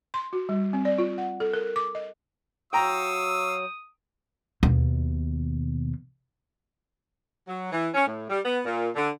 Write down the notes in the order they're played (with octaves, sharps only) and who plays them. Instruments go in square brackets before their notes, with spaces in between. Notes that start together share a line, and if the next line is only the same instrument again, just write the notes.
[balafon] C6
F#4
G3
C4
D5
F4
F#5
A4
A#4
D6
D#5
[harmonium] F#3 [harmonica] F5 C#6 E6 [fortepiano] G5 A#5 [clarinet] D#6
[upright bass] D#2 B2
[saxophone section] F#3
E3
C#4
A2
G3
B3
A#2
D3